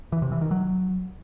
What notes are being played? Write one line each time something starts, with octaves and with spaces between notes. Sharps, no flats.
E3
C3
E3
D#3
F#3